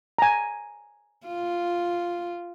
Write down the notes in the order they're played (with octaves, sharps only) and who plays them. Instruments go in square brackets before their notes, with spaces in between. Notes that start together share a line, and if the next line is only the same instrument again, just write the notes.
[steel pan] G#5 A#5
[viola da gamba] F4